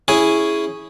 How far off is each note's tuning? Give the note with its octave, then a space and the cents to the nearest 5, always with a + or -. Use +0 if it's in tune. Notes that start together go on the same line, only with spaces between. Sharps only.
C#4 +0 E4 +0 G#4 +0